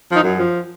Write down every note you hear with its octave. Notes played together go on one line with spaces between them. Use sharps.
F3
D#4
F#2
F3